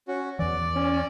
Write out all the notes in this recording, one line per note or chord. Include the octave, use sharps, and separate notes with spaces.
C#4 F#4
E2 E3 D5
C#4